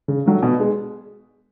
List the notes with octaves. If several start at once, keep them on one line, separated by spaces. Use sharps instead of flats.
C#3
F#3 A3
B2
G#3